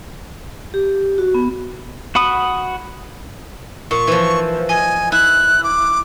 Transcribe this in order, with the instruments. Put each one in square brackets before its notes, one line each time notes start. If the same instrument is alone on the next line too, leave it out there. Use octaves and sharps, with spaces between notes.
[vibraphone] G4
F#4
B3
[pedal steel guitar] F#4 F#5 B5 D#6
[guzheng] A#2 [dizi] C#6
[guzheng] E3 F3
[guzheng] D#5 [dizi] G#5
[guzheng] E4 [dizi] F#6
[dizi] D6